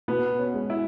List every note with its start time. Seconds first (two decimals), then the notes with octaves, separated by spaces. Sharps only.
0.08 B2 B3
0.39 C#4
0.54 G#3
0.70 E4